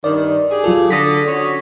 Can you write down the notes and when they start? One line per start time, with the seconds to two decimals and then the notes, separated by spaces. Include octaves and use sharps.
0.04 G2 D#3 D5
0.51 G4 G#4
0.64 F#3 F4 A4
0.90 D3 D#6 A#6 B6
1.28 C#4 F#4